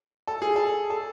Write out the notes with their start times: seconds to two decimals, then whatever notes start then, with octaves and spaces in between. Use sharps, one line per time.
0.27 A4
0.42 G#4
0.56 A4
0.90 A4